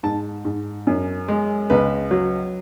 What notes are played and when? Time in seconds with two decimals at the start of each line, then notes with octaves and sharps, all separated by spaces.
0.03 G#2 A5
0.45 G#2
0.87 F#2
1.28 G#3
1.70 C#2 B4
2.11 F#3